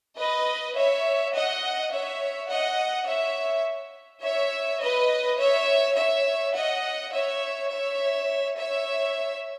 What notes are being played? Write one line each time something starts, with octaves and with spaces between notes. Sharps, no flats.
B4 D#5
C#5 E5
D#5 F#5
C#5 E5
D#5 F#5
C#5 E5
C#5 E5
B4 D#5
C#5 E5
C#5 E5
D#5 F#5
C#5 E5
C#5 E5
C#5 E5